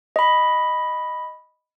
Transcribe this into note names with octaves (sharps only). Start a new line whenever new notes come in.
D#5 B5